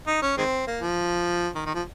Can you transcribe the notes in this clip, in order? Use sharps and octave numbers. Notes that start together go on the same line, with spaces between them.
D#4
C#4
D#3 G#3 C4
A#3
F3
D#3
D#3
F3